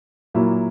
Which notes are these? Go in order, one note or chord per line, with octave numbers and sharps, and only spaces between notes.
A#2 F#3 A#3 E4